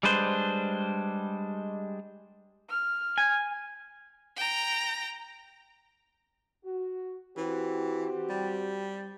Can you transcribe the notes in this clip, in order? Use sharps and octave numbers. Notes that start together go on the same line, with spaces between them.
G3 G#3 D4 B4 C5
F6
G#5
G5 A#5
F#4
E3 C4 F#4 G4
G3